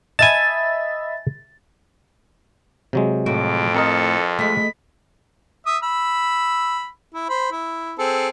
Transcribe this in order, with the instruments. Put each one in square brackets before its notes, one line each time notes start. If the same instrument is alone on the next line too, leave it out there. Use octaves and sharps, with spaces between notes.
[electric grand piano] D#5 E5 B5 [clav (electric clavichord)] G#5 A5 [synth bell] A6
[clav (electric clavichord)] C3 F#3 G#3
[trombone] F2 [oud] A2 F#4 [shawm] D6
[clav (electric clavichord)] C4 A#4 D#5 [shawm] A4
[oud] G#3 A3 [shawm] B5
[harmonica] E5 D#6
B5 E6
E4
C5 B5
E4
C4 G#4 A4